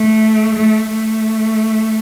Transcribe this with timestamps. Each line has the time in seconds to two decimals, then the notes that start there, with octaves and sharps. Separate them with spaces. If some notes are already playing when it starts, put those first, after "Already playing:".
Already playing: A3
0.57 A3
0.89 A3